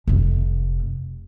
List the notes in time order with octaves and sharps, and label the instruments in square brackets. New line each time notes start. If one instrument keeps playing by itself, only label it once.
[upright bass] F1 C3